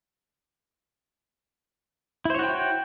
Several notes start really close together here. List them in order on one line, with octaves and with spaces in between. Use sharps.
E4 C5 C#5 F#4 G5